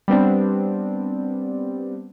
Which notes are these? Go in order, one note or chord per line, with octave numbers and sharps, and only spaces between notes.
G3 B3 C4 D4